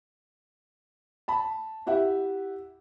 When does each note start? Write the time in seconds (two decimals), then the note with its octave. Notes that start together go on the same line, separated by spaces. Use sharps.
1.28 A5 B5
1.86 E4 G4 E5 F#5